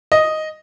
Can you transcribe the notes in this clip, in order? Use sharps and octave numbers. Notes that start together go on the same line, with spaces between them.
D#5